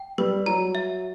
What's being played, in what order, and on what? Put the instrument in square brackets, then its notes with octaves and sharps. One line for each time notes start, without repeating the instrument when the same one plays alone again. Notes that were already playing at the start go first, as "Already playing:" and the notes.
Already playing: [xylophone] G5
[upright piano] G3 [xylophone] B4
[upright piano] F#3 [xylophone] A#5
[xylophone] E5